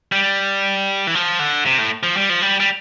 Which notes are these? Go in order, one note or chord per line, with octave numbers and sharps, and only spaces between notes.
G3
E3
F3
D3
C3
A2
F3
G3
F3
G3
G3